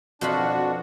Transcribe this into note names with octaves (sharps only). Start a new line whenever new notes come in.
F2 B2 D4 F4 F#4 B5